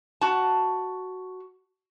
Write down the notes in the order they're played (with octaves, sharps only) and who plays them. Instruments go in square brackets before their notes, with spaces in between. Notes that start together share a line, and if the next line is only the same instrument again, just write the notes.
[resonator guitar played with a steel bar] F#4 A5